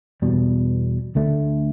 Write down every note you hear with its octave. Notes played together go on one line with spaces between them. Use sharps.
E2 B2 G3
D2 D3 A3